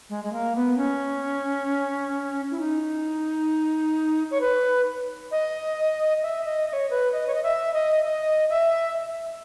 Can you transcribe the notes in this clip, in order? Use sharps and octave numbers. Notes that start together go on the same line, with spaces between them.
G#3
G#3
A#3
B3
C#4
E4
D#4
C#5
B4
D#5
E5
D#5
D#5
C#5
B4
D#5
C#5
D#5
E5
D#5
D#5
E5